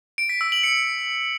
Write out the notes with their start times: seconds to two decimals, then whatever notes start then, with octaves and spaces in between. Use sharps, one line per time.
0.18 D7
0.29 B6
0.41 E6
0.52 F#7
0.63 C#7